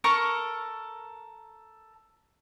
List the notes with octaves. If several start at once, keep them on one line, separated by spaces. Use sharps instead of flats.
A4 A#4 C#6 F6